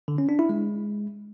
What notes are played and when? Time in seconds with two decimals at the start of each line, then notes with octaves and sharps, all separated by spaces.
0.08 D3
0.18 C#4
0.29 D4
0.39 E4
0.49 G#3